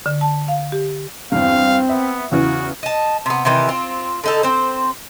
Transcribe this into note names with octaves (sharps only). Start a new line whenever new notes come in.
D3
A5
F5
G4
E2 G2 C4 F5
B3 E5
E2 C#3 E3 F#4
D#5 A5
C3 B3
C3 D#3 E3 G4
C4 F4
D3 D#4 A4
C4 C5